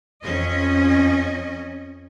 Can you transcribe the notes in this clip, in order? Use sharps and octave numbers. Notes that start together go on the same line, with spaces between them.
F2 C#4 D#5